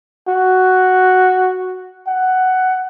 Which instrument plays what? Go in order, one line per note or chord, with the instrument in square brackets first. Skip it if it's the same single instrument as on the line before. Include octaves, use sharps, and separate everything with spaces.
[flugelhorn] F#4
F#5